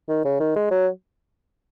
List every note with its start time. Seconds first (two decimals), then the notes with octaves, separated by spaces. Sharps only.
0.09 D#3
0.25 C#3
0.40 D#3
0.56 G#3
0.71 F#3